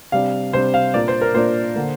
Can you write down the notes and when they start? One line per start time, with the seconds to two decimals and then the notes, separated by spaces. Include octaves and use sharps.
0.12 C3 G3 D4 F5
0.53 C3 G3 D4 C5
0.74 F5
0.94 A#2 A#3 D4 D5
1.08 C5
1.21 A#4
1.34 A#2 A#3 D4 C5
1.76 D3 A#3